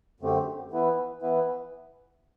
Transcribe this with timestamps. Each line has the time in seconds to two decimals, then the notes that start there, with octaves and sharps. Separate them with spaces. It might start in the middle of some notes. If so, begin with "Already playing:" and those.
0.20 F#2 D3 A3 C4 G4
0.71 E3 B3 E4 B4
1.22 E3 B3 E4 B4